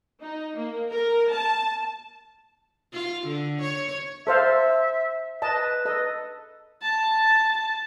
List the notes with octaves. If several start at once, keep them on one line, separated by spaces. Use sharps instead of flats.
D#4
A#3
A#4
A5
F4
D3
C#5
A4 C5 E5 F5
B4 D#5 A5
A4 D#5
A5